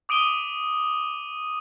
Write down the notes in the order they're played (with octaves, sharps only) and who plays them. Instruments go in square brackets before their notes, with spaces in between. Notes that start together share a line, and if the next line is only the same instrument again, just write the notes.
[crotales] D6 D#6 D7 D#7 G7